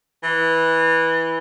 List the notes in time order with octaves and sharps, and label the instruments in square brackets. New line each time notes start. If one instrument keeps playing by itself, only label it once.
[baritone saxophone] E3